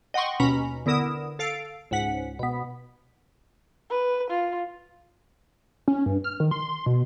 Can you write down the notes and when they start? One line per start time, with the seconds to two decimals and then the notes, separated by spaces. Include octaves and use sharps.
0.14 D#5 F#5 G5 C6 C#6
0.40 D#2 B2 C#4 A#5 B5 B6
0.86 D3 B3 E4 A#4 D#6 E7
1.39 A4 F5 C7 D7
1.91 C#2 G#2 F#5 B6
2.39 B2 B3
3.91 B4
4.30 F4
5.88 C#4
6.06 G2
6.24 F6
6.40 D#3
6.51 C6
6.86 B2